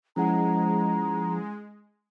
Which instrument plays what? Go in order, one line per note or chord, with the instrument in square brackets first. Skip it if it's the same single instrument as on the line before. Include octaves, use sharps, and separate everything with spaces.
[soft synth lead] F3 [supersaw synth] G#3 [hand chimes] C#4 E4 F#5 [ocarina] A#5